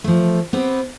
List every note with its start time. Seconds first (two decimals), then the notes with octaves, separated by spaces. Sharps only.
0.04 F3 A3
0.53 B3 C4 G4